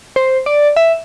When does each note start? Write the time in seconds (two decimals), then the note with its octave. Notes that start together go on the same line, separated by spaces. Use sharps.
0.16 C5
0.46 D5
0.76 E5